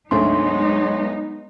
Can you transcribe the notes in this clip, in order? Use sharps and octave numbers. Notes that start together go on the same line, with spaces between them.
D2 G#2 F#3 G#3 A3 B3 D#4 C6